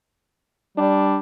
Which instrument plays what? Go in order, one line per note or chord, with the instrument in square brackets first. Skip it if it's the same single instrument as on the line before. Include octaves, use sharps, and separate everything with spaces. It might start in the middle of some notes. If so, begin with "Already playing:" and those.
[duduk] G3 [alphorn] D4